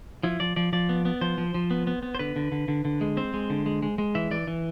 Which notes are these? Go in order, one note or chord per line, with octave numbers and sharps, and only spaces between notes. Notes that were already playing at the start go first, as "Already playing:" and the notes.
F3 E4
F3 D5
F3 D5
F3 D5
B3
B3
F3 C5
F3
F3
B3
B3
B3
C5
D3 B4
D3
D3
D3
D3
G#3
C4 C5
G#3
D3
G#3
G#3
G#3
E3 E5
E3 D5
E3